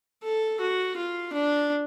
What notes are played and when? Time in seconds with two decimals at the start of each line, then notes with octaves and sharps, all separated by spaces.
0.24 A4
0.61 F#4
0.97 F4
1.34 D4